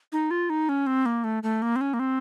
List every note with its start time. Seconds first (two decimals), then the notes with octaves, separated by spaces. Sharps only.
0.12 D#4
0.31 F4
0.50 D#4
0.69 C#4
0.87 C4
1.06 A#3
1.24 A3
1.43 A3
1.62 A#3
1.76 C4
1.81 C#4
1.94 A#3
1.99 C4